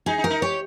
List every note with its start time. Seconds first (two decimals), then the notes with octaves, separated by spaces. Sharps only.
0.06 D#4 G#4
0.18 D#4
0.24 A#4
0.30 D#4
0.42 G4 C#5